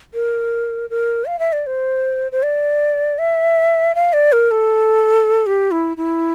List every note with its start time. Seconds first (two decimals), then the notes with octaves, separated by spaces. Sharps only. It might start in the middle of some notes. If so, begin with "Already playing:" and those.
0.14 A#4
0.90 A#4
1.26 F5
1.39 E5
1.53 D5
1.67 C5
2.32 C5
2.43 D5
3.18 E5
3.95 F5
4.13 D5
4.32 A#4
4.51 A4
5.46 G4
5.71 E4
5.97 E4